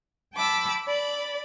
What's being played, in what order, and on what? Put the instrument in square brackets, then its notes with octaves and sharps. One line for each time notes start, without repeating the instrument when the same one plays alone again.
[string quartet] G5 A5 B5 D6 E6
D5 B5